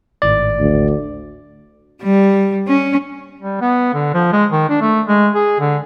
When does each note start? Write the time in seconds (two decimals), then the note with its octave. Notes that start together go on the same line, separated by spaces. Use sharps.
0.22 G#1 A2 D5
0.60 D2
2.03 G3
2.68 C#4
3.40 G3
3.61 B3
3.94 D3
4.14 F3
4.32 G#3
4.52 D#3
4.69 D4
4.82 A3
5.07 G#3
5.35 G#4
5.60 D3